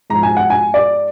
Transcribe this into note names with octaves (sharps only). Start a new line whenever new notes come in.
G#2 F3 A#5
G#5
F#5
G#5
D5